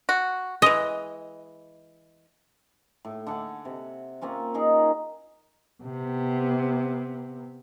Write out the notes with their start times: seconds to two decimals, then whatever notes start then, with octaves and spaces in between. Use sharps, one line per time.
0.09 F#4
0.62 E3 G#3 D#5
3.05 A2
3.27 D3 F#5 G#5
3.65 C3
4.21 A#3 C4 C#4 F4
4.54 C#4 D#4 G#4 A#4
5.83 C3 B3